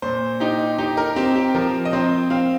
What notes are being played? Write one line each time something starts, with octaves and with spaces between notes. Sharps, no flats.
A#2 C5
D#4 G4
D#4 G4
A#4
C4 G4
G4
F3 A#4
D#5
C4 C5
C4 F5